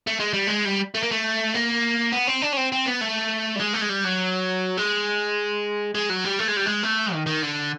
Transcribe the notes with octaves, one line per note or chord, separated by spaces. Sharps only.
A3
G#3
G3
G#3
G3
A3
A#3
A3
A#3
B3
C4
D4
C#4
C4
C4
B3
A3
G3
G#3
A3
G#3
G3
F#3
G#3
G#3
F#3
G3
A3
G#3
G3
G#3
A3
D#3
D#3
D3